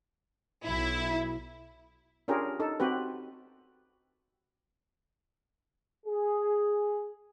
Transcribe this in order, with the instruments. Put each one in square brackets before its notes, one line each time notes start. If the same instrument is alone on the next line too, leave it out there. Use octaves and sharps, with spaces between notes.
[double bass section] B1 [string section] E4
[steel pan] C#4 D4 F4 G4 G#4 A#4
D#4 A4
C4 F#4 G4 B4
[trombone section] G#4